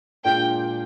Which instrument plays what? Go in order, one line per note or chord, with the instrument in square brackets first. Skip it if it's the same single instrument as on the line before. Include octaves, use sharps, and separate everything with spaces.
[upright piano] A#2 G#3 D4 F4 [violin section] G5